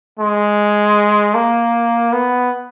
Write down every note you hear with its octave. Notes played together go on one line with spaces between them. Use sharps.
G#3
A#3
B3